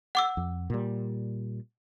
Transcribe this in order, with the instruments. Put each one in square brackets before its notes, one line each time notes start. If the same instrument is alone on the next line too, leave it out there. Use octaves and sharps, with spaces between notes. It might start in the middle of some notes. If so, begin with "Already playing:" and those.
[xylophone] F#5 D6 E6
[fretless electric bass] F2
A#2 G3